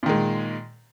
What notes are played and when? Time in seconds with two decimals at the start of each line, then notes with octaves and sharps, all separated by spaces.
0.03 A#2
0.06 D#3
0.09 G#3